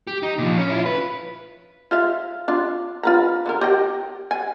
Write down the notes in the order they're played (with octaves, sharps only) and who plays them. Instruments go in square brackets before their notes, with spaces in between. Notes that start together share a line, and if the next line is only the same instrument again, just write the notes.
[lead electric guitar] G4
D#4
A#2 F3
C#4
E4 F4
B4
[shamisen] F4 E5 F5
D4 F4
F4 B4 A#5
D3 F3 A#4
G4 D#5 G5
G#5